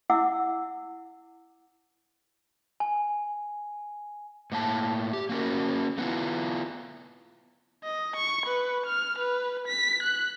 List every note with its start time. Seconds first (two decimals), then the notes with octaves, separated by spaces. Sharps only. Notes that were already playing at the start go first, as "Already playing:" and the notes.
0.10 E4 F#5 D6 E6
2.80 G#5
4.52 A2 A#3 G5 A5
5.13 G4
5.29 A#3 C#4 F#4 A#4
5.98 A3 B3 C#4 E4 F4
7.84 D#5
8.16 C#6
8.46 B4
8.86 F6
9.18 B4
9.68 B6
10.03 F#6